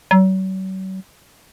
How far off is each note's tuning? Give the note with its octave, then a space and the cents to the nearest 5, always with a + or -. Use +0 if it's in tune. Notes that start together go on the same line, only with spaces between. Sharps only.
F#3 +40